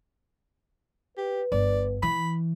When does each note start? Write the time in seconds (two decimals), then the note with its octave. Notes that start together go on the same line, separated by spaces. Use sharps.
1.17 G4 B4
1.52 G1 D5
2.03 E3 B5